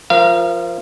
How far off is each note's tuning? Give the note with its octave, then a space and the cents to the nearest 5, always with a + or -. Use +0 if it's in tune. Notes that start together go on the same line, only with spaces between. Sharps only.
F3 +0 A#4 +15 F5 -35